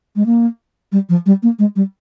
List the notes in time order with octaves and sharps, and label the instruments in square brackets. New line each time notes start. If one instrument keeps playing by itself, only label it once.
[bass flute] G#3
A#3
G3
F3
G3
A#3
G#3
G3